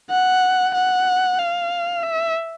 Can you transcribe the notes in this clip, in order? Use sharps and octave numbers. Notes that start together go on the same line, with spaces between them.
F#5
F#5
F5
E5